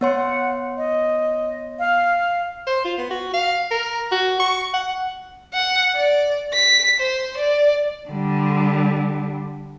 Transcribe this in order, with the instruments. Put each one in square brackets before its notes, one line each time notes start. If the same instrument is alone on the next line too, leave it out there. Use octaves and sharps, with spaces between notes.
[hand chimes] B3 C#5 C6 [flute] F#5
[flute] D#5
F5
[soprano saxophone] C5
F4
B3
F#4
F5
A#4
F#4
C#6
F#5
[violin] F#5
D5
B6
C5
D5
[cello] D3 G3